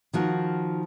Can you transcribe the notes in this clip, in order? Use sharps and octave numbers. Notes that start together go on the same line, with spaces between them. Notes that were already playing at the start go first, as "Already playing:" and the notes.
D#3 F3 F#4